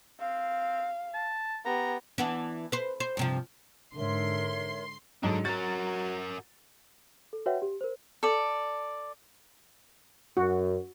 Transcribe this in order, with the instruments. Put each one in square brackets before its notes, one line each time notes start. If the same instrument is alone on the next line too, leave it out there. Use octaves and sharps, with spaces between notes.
[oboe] C4 [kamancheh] F5
[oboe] A5
[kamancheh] B3 G4 [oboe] A#5
[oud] E3 B3 D4
B4 C5
C5
G2 C3 F3
[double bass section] G#2 D3 [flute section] A#4 C#5 E5 [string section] C6
[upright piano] G#2 F#3 [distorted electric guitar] D4 A4
[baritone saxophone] F#3 [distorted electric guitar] F#4 A#4 [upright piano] A6
[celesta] A4
F#4 B4 C#5 E5 F#5 G5
G4
A#4 C5
[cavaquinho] A4 D5
[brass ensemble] F#2 [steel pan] F#4